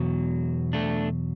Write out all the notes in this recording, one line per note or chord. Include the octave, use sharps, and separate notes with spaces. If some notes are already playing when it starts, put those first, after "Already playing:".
Already playing: E2 B2 F#3
A3 D4